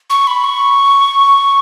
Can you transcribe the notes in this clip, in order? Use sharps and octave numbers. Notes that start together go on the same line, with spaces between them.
C#6
B5
C#6